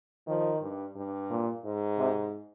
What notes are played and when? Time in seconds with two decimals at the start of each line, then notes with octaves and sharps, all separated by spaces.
0.27 D#3 F3
0.62 G2
0.96 G2
1.30 A#2
1.65 G#2
1.99 C3